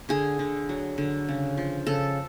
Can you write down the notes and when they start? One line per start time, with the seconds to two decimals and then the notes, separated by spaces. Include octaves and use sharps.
0.09 D3 G#4
0.39 D3
0.69 F#3
0.98 D3
1.28 C#3
1.57 F3
1.87 C#3 A4